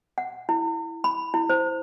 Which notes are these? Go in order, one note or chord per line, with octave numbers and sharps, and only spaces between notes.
F#5
E4
B5
E4
C5